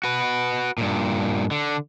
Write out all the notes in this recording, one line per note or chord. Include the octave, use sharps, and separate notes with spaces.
F#4 B4
G2 A#2
D3